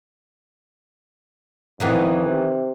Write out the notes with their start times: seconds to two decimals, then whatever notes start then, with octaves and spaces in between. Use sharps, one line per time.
1.80 F2 D#3 E3 B3
2.25 C3